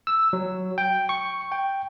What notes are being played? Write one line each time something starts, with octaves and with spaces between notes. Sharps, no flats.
E6
F#3
G5
C#6
G5